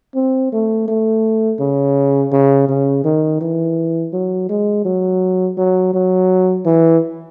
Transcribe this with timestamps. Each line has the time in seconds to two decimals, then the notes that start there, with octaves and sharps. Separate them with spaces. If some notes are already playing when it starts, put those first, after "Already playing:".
0.15 C4
0.53 A3
0.88 A3
1.60 C#3
2.32 C#3
2.69 C#3
3.04 D#3
3.41 E3
4.13 F#3
4.49 G#3
4.85 F#3
5.58 F#3
5.94 F#3
6.66 E3